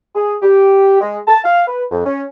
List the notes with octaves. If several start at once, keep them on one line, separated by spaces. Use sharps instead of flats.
G#4
G4
G#3
A5
F5
B4
F2
C#4